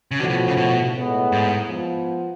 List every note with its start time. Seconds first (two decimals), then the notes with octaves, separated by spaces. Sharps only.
0.11 C#3
0.19 A2 D3 F3 B3 F#4
0.30 B2
0.48 C#3
0.57 B2
0.94 A2 G#3 B3
1.32 G#2
1.69 F3 B3